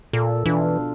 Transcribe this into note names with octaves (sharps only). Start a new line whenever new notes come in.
A#2 A4
B2 E3 D4 F4